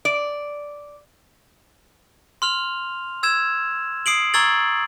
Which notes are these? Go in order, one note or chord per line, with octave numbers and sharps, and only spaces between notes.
D5
C6 F6 F7
E6 G#6 E7
D#6 C7 D7 F#7
A#5 C#6 E6 G#6 A6 F#7